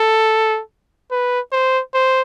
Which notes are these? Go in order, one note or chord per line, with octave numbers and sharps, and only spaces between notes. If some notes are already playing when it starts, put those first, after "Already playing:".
Already playing: A4
B4
C5
C5